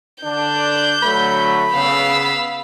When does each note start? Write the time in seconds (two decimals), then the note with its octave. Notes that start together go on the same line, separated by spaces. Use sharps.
0.24 D3 D4 G6
1.03 D3 F#3 A3 B5
1.73 C#3 B3 F5 E6